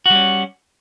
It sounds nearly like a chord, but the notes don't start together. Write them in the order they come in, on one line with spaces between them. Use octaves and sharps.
F#4 G3 C#4